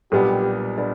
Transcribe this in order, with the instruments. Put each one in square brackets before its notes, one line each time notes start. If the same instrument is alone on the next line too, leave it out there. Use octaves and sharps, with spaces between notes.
[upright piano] B1 A#2 G3 B3 D4 [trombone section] G4
[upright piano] B3 D4